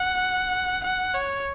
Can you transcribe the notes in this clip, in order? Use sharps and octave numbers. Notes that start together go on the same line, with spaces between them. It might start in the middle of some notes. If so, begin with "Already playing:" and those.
Already playing: F#5
F#5
C#5